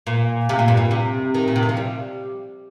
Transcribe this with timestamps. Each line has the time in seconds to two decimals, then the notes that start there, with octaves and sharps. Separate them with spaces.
0.07 A#2
0.49 C3
0.59 A#2
0.68 G2
0.77 A#2
0.91 C3
1.34 D#3
1.48 A#2
1.56 C3
1.63 D#3
1.69 F3
1.77 G3